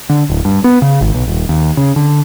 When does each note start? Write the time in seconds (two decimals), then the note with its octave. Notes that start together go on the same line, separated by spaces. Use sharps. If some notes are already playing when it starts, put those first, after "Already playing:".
0.09 D3
0.30 D1
0.45 G2
0.64 B3
0.82 C#3
1.01 G#1
1.14 B1
1.27 D#1
1.49 D#2
1.77 C#3
1.96 D3